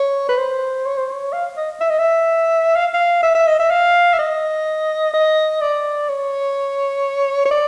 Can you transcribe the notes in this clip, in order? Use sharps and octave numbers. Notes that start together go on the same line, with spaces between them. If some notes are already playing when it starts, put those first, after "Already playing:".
Already playing: C#5
B4
C5
C#5
C5
C#5
F5
D#5
E5
D#5
E5
F5
F5
E5
E5
D#5
E5
F5
E5
D#5
D#5
D5
C#5
C#5
D5